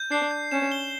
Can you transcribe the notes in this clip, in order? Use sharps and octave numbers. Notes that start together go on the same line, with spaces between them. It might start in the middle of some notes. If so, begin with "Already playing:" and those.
Already playing: G6
D4 C7
G6
C#4 E7
G7